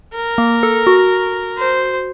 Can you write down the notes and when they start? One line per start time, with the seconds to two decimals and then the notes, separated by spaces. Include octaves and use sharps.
0.15 A#4
0.38 A#3
0.63 A4
0.87 F#4
1.58 C5